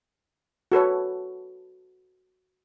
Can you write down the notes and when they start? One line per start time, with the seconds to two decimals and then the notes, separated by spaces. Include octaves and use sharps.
0.72 F#4 A4 B4 C#5